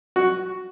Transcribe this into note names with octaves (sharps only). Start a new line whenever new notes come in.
F#4